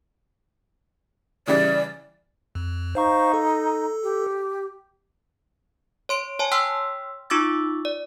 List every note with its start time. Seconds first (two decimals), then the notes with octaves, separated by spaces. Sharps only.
1.47 C#3 E3 G3 D5
2.55 F2
2.95 D#4 C5 F5 C#6
3.33 A4
4.03 G4
6.09 C#5 C6 D7
6.39 C#5 G#5 A5
6.52 C#5 G5 C6 E6 F6 B6
7.30 D#4 F4 C#6 D6 E6 A6
7.85 D5